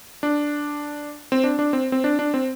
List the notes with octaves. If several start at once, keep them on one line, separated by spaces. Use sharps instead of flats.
D4
C4
D4
D4
C4
C4
D4
D4
C4